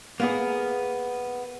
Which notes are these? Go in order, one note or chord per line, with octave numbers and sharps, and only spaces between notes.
A#3 B3 G#4